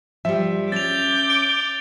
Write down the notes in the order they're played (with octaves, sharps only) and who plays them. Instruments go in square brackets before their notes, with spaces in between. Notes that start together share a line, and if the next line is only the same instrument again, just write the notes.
[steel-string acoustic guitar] F3 G3 [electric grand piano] E5
[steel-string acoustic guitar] C#4 [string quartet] D6 G6 [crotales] A6 F7
[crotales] D7